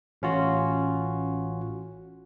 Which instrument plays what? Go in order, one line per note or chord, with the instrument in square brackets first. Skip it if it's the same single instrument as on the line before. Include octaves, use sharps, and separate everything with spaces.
[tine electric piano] A1 C#4 F4 F#4